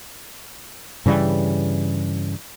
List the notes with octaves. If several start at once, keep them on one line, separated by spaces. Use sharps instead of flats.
G2 C#3 E3 G3